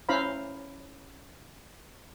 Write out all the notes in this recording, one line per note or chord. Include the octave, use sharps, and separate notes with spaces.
C#4 E4 C5 F5 A#5 B5